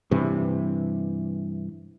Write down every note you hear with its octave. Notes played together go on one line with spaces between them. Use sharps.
G2 C3 E3